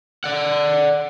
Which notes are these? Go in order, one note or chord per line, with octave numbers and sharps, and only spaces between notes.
D5 F#5